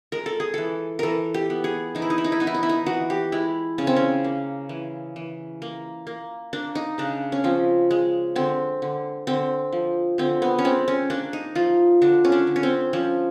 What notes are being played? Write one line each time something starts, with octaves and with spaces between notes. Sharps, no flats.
G#3 A#4
A4
G#4
E3 A4
E3 A4 A#4
G4
B3
G#4
E3 D#4
E4
D#4
E4
D#4
E4
B3 D#4
E4
D#4
E4
D#4
E3 F#4
G4
G#3 E4
C#3 C#4
C4
C#4
A#3
E3
E3
A#3
A#3
A#3 D4
D#4
C#3 D4
C#4
F3 C4
G#3
D3 C4
D3
D3 C4
F3
D3 C4
B3
C#4
G#3 C4
C#4
A#3 D4
D#4
F3 F4
D3 D4
C#4
D4
D3
C#4
C4
F3 C#4